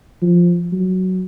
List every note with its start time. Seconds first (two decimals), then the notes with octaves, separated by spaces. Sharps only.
0.22 F3
0.72 F#3